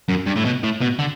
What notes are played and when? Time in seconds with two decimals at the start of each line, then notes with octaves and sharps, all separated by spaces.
0.09 F#2
0.27 G2
0.36 A2
0.45 B2
0.64 A2
0.81 B2
0.99 D3